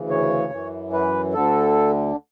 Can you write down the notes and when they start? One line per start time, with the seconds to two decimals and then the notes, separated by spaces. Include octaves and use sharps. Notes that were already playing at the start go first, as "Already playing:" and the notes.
Already playing: D2 C#3 E3
0.10 C#5
0.52 F#2 E3
0.93 B4
1.34 D2 D3 A4